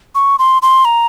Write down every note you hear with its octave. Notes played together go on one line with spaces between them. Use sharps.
C#6
C6
C6
A#5